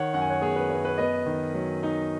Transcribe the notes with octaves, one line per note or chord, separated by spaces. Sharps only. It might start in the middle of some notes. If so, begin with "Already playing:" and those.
Already playing: D#3 C#5 F#5
F#2 F#5
G#5
C#5 F#5
B3 G#4 C#5
B4
F#2 B4
B4
B3 B4 D#5
D#3
F#3
D#4